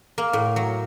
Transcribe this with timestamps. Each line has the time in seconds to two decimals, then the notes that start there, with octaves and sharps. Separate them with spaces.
0.18 A#3
0.33 A2
0.56 F#3